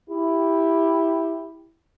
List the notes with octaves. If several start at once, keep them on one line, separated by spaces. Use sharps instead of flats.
E4 G4